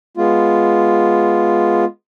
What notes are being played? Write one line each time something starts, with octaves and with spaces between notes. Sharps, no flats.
G#3 B3 F4